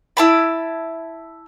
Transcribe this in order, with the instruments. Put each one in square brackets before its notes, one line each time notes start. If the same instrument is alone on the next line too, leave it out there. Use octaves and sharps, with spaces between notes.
[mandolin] E4 A5 B5